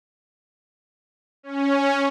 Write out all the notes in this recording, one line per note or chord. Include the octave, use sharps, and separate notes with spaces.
C#4